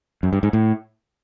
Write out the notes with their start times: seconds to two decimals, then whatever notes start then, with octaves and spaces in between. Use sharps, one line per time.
0.23 F#2
0.33 G2
0.43 G#2
0.53 A2